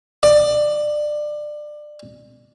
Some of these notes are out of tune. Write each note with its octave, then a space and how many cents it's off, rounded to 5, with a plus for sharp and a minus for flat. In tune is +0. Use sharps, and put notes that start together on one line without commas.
D5 +20